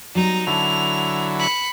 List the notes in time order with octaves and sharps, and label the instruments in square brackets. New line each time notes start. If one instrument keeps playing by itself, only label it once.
[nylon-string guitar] F#3 G3 B3 [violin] D#4 A#5
[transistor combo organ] D3 F#3 E4 [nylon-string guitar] A5 [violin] F7
[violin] B5 C#7